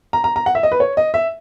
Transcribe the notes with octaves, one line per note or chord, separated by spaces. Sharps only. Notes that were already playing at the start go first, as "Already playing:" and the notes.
A#5
A#5
A#5
F#5
E5
D#5
B4
C#5
D#5
E5